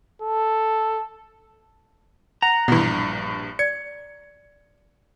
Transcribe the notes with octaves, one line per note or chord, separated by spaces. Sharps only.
A4
F#5 A#5
A#1 G2 B2 E3
D5 C#7